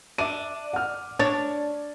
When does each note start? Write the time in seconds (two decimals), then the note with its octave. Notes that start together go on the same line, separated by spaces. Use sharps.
0.18 D4 E5 D6 D#7
0.73 F#5 F6
1.19 D4 C#5 A6